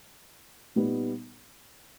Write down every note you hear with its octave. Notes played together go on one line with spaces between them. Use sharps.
A#2 G3 B3 D#4